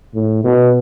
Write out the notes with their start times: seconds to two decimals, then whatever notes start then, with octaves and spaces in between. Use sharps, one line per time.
0.14 A2
0.44 B2